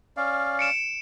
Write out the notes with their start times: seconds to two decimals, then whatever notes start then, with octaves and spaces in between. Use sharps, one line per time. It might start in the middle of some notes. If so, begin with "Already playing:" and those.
0.17 C#4 D5 F5
0.59 C#7 D7 E7